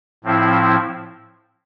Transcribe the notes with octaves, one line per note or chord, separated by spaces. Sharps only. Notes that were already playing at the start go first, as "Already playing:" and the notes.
A2 F3 C4 E4